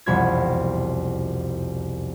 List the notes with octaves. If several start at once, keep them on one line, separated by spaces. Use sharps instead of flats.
E1 C2 F2 F#5 B5 G#6